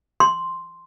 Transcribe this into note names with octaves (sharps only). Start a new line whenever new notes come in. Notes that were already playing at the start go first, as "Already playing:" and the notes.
C6